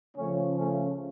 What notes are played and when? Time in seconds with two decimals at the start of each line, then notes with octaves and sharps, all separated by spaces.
0.17 C#3 F3 A3 C#4
0.58 A3 C#4